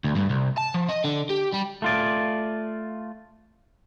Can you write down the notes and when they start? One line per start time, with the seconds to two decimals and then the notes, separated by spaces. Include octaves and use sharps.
0.04 D2
0.16 G2
0.30 C2
0.58 A5
0.74 F3
0.89 D#5
1.05 D3
1.30 G4
1.54 G3
1.82 A3 F4 D5